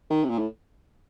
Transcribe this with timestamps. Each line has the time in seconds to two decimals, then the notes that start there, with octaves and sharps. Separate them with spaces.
0.10 D#3
0.24 C3
0.29 A#2
0.39 A2